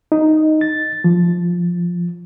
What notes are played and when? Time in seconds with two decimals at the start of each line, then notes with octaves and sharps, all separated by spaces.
0.12 D#4
0.61 A6
1.04 F3